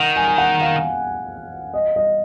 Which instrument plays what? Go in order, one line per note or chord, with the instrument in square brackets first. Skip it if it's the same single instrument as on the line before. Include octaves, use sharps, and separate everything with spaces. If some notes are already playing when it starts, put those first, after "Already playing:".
Already playing: [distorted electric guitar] D#3 [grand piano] F#5
[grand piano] G#5
G#5
F#5
F5
D#5
D#5